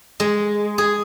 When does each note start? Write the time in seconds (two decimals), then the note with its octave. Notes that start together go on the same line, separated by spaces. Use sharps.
0.20 G#3
0.78 G#4